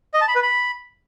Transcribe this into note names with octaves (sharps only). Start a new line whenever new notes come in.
D#5
A5
B5
B4
B5